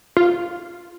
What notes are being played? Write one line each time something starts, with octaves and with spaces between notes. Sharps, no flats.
F4